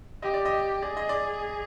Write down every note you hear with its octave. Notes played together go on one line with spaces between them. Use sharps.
G4 D#5
D5
D#5
G#4 D5
D#5
D5